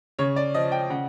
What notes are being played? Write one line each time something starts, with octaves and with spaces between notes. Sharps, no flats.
C#3 C#5
D5
F3 D#5
G5
C#3 F#5